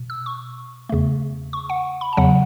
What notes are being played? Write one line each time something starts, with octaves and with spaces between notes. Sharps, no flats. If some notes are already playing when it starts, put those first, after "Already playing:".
Already playing: B2
E6
C#6
E2 C#3 A3
C#6
F#5
B5
A5
E2 C#3 F#3 F#5